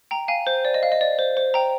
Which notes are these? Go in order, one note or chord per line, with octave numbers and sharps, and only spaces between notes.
G5 A#5
F5 G#5
C5
D5
D#5
F5
D#5
D5
C5
C5
G5 A#5